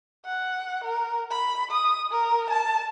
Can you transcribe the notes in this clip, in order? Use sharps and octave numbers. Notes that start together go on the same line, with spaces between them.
F#5
A#4
B5
D#6
A#4
A5